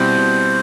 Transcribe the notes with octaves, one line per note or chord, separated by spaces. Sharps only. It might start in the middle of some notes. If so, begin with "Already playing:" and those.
Already playing: B2 G3 C4 E4 C5
B2